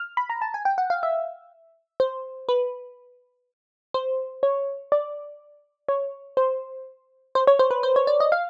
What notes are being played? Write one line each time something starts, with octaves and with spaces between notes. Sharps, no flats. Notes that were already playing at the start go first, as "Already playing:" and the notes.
Already playing: F6
B5
A#5
A5
G#5
G5
F#5
F5
E5
C5
B4
C5
C#5
D5
C#5
C5
C5
C#5
C5
B4
C5
C#5
D5
D#5
F5